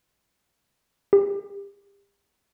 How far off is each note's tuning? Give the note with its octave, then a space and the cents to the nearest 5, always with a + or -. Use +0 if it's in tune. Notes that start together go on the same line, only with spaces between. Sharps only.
G4 +35